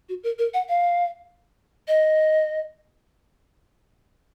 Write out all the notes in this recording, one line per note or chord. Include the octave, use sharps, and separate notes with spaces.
F#4
A#4
A#4
F#5
F5
D#5